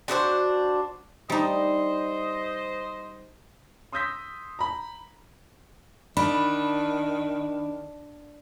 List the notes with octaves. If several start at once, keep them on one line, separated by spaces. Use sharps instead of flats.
D4 F#4 G#4 C5
G3 D#4 C5 D#5
C6 D#6 E6 G6 A#6 B6
A#5 B5
D#3 D4 B5